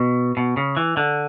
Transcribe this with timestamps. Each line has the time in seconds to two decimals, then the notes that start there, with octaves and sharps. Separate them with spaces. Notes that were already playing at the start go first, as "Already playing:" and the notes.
Already playing: B2
0.37 B2
0.57 C#3
0.77 E3
0.97 D3